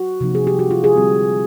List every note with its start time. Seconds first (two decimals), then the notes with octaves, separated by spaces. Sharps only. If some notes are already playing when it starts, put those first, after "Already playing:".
Already playing: F#4
0.21 C3 F3 A#3 D#4
0.35 G#4
0.47 G4
0.59 F#4
0.71 F4
0.84 G#4
0.96 D3 G3 C4